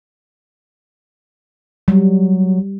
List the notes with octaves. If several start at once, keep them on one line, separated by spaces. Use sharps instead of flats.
F#3 G3